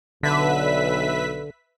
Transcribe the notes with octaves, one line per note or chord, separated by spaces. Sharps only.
B1 D3 B4 E5 B6